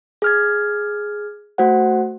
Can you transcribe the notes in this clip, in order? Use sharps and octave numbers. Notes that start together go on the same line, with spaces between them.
G#4 F6 G#6
A3 F#4 C5 F#5